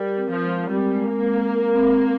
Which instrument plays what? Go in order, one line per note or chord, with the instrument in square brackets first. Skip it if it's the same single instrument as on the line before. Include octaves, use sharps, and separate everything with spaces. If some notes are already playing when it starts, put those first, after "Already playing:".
Already playing: [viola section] G3 [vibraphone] A#4
[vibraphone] C4
[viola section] F3
[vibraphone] G#3
[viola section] G3 [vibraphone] C4
[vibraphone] G#3
[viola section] A#3
[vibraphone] G#3
A#4
C4
A#4